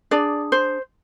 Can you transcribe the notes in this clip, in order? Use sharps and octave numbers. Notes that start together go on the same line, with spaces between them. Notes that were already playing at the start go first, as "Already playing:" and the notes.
D4 G#4 D5
C5